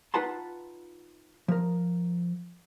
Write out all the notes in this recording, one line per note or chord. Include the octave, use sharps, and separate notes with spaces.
D#4 F4 B4 F#5 A5 C6
F3 A#4